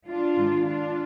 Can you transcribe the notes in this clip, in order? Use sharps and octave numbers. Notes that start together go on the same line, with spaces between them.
D4 F4
G#2 D#3 G#3
D4 F4